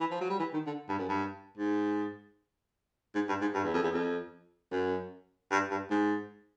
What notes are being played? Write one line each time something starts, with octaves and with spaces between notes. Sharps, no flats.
E3
F3
F#3
G3
E3
D#3
D3
G2
F#2
G2
G#2
G#2
G2
G#2
G2
E2
F2
E2
F2
F#2
G2
G2
G#2